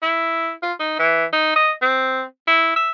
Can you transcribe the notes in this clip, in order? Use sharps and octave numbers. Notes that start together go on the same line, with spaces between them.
E4
F4
D#4
E3
D#4
D#5
C4
E4
E5